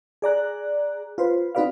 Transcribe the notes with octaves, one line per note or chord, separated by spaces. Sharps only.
G#4 D5 A#5 F#6
F4 B4 C5
C4 D#4 F#4 B4 D5 F5